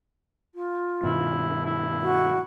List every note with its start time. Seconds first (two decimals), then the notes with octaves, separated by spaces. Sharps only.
0.54 F4
1.03 G2 B2 D#3 E4
1.65 E4
2.01 F#4